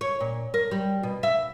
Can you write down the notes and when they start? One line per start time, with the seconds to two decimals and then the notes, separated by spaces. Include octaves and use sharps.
0.01 C#5
0.21 A#2
0.54 A#4
0.71 G3
1.03 B2
1.23 E5